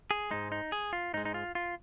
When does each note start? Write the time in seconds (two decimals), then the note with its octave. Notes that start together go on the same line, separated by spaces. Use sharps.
0.11 G#4
0.31 G#2 G#3 D#4
0.52 D#4
0.72 G#4
0.93 F4
1.14 G#2 D#4
1.17 G#3
1.25 D#4
1.34 F4
1.55 F4